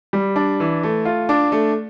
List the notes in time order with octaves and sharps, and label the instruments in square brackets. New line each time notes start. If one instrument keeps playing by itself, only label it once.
[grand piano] G3
D4
E3
A3
F4
D4
A3